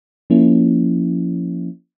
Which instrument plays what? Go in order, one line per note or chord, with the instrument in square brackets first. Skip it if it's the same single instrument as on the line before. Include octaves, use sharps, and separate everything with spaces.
[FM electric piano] F3 A#3 C#4 E4